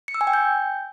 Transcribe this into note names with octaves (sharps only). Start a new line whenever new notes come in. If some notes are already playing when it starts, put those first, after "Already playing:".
C#7
E6
G#5
G5
G6